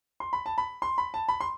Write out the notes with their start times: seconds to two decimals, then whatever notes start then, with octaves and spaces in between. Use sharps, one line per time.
0.20 C6
0.33 B5
0.46 A5
0.58 B5
0.82 C6
0.98 B5
1.14 A5
1.29 B5
1.41 C6